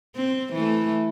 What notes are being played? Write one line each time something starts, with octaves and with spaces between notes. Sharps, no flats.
C4
E3 A3